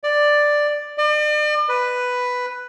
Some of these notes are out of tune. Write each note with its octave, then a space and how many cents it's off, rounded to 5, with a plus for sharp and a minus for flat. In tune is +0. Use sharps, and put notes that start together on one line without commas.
D5 +5
D5 +40
B4 +5